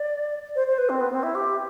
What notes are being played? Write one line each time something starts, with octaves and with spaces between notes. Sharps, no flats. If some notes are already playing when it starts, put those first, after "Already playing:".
Already playing: D5
C5
C5
B4
C4
B3
C4
E4
G4